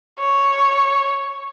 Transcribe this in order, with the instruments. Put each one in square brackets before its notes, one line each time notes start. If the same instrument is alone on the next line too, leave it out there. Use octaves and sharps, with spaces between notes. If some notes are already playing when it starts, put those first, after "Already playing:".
[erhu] C#5